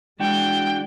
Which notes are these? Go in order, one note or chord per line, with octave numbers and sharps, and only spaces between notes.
E3 G#3 D4 F#4 G5